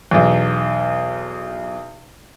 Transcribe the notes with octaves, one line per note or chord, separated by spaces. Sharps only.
B1 E2